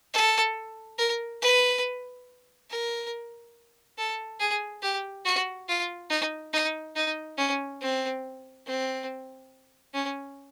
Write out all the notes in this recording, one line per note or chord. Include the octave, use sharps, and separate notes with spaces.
A4
A#4
B4
A#4
A4
G#4
G4
F#4
F4
D#4
D#4
D#4
C#4
C4
C4
C#4